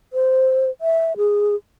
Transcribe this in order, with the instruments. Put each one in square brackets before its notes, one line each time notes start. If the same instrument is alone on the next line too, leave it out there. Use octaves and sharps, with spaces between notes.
[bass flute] C5
E5
G#4